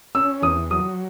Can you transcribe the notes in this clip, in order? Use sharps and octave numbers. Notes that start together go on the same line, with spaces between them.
C#4 E6
E2 D#6
F#3 D#6